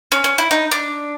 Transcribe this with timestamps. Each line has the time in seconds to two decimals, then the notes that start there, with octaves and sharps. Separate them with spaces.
0.12 C#4
0.24 C#4
0.38 E4
0.51 D#4
0.71 D4